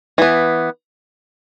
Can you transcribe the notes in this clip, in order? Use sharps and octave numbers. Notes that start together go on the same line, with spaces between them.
E3 B3